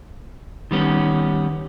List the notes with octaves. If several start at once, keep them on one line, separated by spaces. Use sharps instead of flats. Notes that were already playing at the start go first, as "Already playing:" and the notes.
D#3 G3 B3 C#4